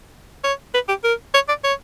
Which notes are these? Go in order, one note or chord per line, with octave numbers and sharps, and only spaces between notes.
C#5
B4
G4
A#4
C#5
D5
C#5